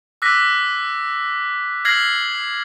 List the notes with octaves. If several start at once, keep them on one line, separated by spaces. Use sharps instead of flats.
D6 E6 F#6 A#6 B6
F6 G#6 A#6 C7 F#7